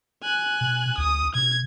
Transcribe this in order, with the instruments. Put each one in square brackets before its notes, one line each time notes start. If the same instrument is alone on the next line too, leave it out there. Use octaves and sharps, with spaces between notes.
[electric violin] G#5 F#6
[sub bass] B2
[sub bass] D2 [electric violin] D#6
[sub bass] B2 [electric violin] G#6